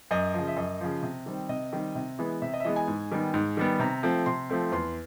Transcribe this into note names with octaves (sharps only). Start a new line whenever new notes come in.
F#2 D#5
C#3 F3
E5
F#2 D#5
C#3 F3
C3
D#3 G3 C4
C3 D#5
D#3 G3 C4
C3
E3 G#3 B3
C3 E5
D#5
E5
E3 G#3 B3 D#5
G#5
G#2
D#3 G3 B3
G#2
D#3 G3 B3
C3 A#5
F3 A3 C4
C3 C6
F3 A3 C4
E2 C6